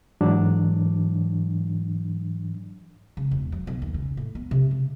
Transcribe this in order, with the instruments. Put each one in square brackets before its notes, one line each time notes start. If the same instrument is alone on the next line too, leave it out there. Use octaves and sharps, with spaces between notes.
[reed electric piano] G#2 E3 F#3 D4
[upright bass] C#3
E1
F#3
B1
D#2
C#3
A2
B3
C3
C#3